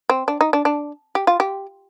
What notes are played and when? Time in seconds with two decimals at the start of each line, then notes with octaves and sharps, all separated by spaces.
0.10 C4
0.28 D4
0.41 D#4
0.53 D4
0.65 D4
1.15 G4
1.27 F4
1.40 G4